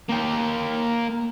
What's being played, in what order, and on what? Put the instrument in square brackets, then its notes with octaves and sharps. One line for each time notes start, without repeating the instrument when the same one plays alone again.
[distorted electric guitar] A#3 G5